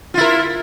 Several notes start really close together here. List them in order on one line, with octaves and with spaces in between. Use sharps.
F4 E4 A#4